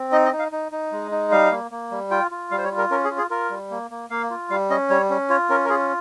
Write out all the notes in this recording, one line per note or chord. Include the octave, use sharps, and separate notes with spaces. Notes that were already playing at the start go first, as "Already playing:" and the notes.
Already playing: C4
D#4 D#5
D#5
D#4
F5
D#4
D#4
G#3
D#4
G3 F5
A#3
A#3
G3
F4 G5
F4
G3 F5
C5
C#5
F4
A#4
C#4 A#4
G#4
F4
G#4
F4 A#4
G3
A#3
A#3
A#3 F5
F4
G3 F5
C#4 D#5
G3 C#5
C#4
F4 C#5
C#4 A#4
A#4
F4 G#4